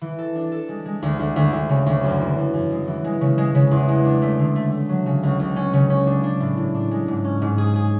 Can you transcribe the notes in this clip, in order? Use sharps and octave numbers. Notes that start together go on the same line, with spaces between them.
E3
A4
D4
A4
G#3
G#3
D2
D2
D2
D2
C#3
D2
F#2
E3
F#2
F#2
G#3
E3
G#3
C#3
G#3
C#3
E2
G#3
D4
A3
D3
A3
A3
F#3
C#3
C#2
C#2
C#4
C#3
C#4
D4
D4
A2
A2
D4
G#3
G#2
C#4
G#2
G#4
G#4